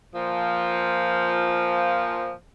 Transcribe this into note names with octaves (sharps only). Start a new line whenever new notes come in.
A#2 F3